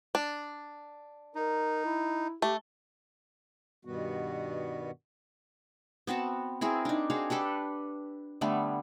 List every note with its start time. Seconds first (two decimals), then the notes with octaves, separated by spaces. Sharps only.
0.15 D4
1.35 D#4 A#4
1.85 E4
2.42 A3 G4
3.85 G2 B2 D#3 G3 B3 F#4
6.07 B3 C4 F#4 A5
6.61 C4 E4 G#4 A#4
6.85 D4 D#4
7.10 C4 F#4 G#4 F5
7.30 D4 G4 A4 B4
8.41 D3 G3 A3 B3